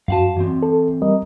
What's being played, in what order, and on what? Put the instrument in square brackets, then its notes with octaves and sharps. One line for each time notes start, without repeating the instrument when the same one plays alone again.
[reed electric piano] F#2 F#4 [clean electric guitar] F5 F#5 A5
[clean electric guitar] E3 C4
[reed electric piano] A4
G3 A#4 D#5